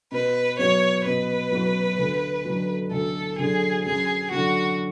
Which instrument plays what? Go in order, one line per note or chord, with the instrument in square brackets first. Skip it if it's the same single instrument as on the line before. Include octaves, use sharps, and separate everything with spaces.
[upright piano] B2 [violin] B4
[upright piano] F#3 B3 F#4 [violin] C#5
[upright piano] B2 [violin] B4
[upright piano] F#3 B3 F#4
D2
F#3
D3
[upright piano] D2 [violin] A4
[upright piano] D3 F#3 [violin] G#4
[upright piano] F#2 [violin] G#4
[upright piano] D3 F#3 [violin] F#4